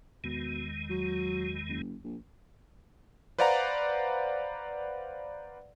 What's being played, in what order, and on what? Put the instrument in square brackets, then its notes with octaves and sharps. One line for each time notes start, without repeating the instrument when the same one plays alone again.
[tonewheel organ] E2 D#3 G#3 [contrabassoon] B2
[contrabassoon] F#3
F#1
A#1
[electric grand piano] B4 C5 D5 F5 F#5 A#5